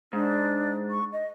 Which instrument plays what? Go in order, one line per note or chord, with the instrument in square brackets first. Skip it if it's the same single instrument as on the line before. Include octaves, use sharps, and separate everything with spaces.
[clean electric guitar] G#2 [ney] D4
[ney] C#6
D#5